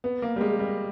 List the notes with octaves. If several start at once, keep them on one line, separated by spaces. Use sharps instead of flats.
B3
A#3
G3
G#3
G3